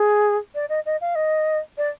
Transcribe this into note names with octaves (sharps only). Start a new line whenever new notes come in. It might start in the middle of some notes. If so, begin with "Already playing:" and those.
Already playing: G#4
D5
D#5
D#5
F5
D#5
D5